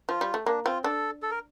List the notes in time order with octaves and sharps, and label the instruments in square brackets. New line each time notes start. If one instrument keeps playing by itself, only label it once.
[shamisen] F3 [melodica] F4
[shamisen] G3
A3
[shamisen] A#3 [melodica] D4
[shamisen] C4 [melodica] F4
[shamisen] D4 [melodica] A4
[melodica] A4
A#4